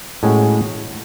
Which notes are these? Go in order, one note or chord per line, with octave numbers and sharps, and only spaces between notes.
A2 G#3 C#4 F#4